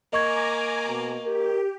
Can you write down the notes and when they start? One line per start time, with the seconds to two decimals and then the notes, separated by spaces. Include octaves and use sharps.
0.13 A#3 D#5 G#5 A#5 C#6 D6 G#6
0.87 B2
1.25 G4 A#4